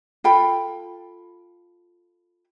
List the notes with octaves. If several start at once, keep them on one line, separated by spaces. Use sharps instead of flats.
F4 A4 G5 B5